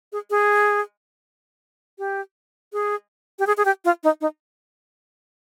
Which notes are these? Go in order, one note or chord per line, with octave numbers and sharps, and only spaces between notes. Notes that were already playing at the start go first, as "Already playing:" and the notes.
G#4
G#4
G4
G#4
G4
G#4
G#4
G4
F4
D#4
D#4